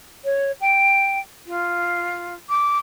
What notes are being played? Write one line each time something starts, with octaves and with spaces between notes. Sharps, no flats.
C#5
G5
F4
D6